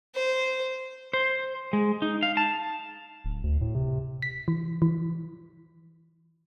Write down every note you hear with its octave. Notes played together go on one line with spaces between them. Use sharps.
C5
C5
G#3
D#4
F5
A5
D1
D2
A2
C3
B6
E3
E3